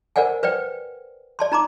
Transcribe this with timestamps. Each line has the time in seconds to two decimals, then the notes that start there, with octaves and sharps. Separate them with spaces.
0.16 A#4 C5 D5 F#5 G#5
0.43 B4 C5 D5 G5
1.39 D5 A5 C6
1.52 D#4 A#5 C6 D6